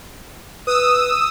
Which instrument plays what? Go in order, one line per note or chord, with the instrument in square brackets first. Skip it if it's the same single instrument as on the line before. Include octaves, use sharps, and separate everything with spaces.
[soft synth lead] B4 [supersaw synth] D#6 E6